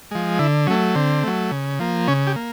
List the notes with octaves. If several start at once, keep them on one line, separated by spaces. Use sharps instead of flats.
F3 G#3
D3 E4
F#3 A3 C#4
D3 C4
F#3 A3
C#3
F3 A#3
C#3 C#4
G4
A#3